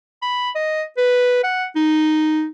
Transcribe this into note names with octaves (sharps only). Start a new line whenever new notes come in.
B5
D#5
B4
F#5
D#4